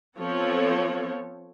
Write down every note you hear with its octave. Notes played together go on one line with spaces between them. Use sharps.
F3 B3 C4 A4 C#5